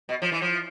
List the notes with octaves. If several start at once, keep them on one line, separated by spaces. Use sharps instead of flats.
B2
F3
E3
F3